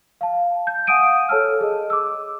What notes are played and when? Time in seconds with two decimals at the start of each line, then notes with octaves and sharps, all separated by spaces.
0.21 F5 A5
0.67 G6
0.87 F5 F#5 G#5 D#6 D7 D#7
1.29 A4 C#5 A5 E6 F6
1.61 G#4 D#5
1.90 D6 E6